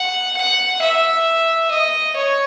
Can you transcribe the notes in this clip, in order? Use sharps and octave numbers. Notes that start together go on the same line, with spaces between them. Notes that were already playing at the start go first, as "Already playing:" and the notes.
Already playing: F#5
F#5
E5
D#5
C#5